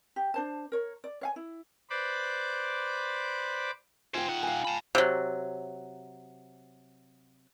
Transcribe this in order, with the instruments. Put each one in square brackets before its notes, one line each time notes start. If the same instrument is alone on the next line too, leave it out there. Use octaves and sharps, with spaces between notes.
[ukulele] G4
D4 C5 A5
A#4 C#5
D5
C#5 F5 G#5
E4
[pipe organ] B4 C5 D5 B5 D6
[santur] F4 G5 [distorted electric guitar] C5 G#5
[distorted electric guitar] D#4 F#5
[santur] F5 G#5
[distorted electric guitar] A5 B5
[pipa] C3 F#3